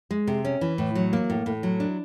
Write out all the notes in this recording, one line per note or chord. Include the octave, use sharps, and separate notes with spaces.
G#3
C3
C#4
E3
A2
F#3
A#3
A2
A2
F#3
D4